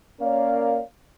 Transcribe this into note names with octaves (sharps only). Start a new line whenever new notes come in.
A#3 C#4 A#4 C#5 D5 F5